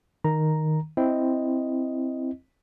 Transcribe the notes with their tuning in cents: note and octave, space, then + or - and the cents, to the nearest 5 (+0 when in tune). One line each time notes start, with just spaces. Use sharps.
D#3 +0 A#5 +0
C4 +0 E4 +0 D#5 +0